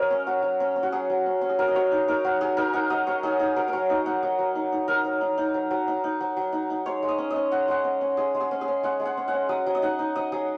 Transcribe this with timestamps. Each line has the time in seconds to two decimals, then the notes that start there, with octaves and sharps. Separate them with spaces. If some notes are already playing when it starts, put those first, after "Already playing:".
Already playing: F#3 A#4 C#5 D#5 F#5
0.11 C#4
0.26 F#3 F#4
0.43 F#3
0.60 C#4
0.76 C#4
0.83 F#4
0.92 F#3 G#4
1.10 F#3
1.26 C#4
1.41 C#4
1.49 G#4
1.59 F#3 A#4
1.68 D#5
1.74 F#3 C#5
1.92 D#4
2.08 D#4 A#4
2.25 F#3 F#4
2.41 F#3 G#4
2.57 D#4 A#4
2.73 D#4 F#5
2.90 F#3 D#5
3.07 F#3 C#5
3.23 D#4 G#4
3.39 D#4 G#4
3.56 F#3 A#4
3.68 A#4
3.73 F#3 C#5
3.90 D#4 D#5
4.06 D#4 F#5
4.23 F#3 D#5
4.39 F#3
4.55 D#4
4.72 D#4
4.88 F#3 A#4
5.05 F#3
5.21 D#4
5.38 D#4
5.54 F#3
5.71 F#3
5.88 D#4
6.04 D#4
6.20 F#3
6.37 F#3
6.53 D#4
6.70 D#4
6.86 G#3 C#5
7.03 G#3
7.09 D#5
7.18 C#4
7.30 D#5
7.36 C#4
7.52 G#3 F#5
7.68 G#3 F#5
7.84 C#4
8.01 C#4
8.17 G#3 G#4
8.35 G#3
8.40 G#4
8.51 C#4
8.61 G#4
8.68 C#4
8.83 G#3 F#5
9.00 G#3
9.05 F#5
9.17 C#4
9.28 F#5
9.33 C#4
9.49 F#3 D#5
9.66 F#3
9.75 D#5
9.82 D#4 F#5
9.99 D#4
10.15 F#3 D#5
10.32 F#3 G#4